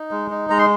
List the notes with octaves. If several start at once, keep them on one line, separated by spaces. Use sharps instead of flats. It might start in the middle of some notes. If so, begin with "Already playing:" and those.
Already playing: D#4
G#3
D#4
G#3 A#5
C6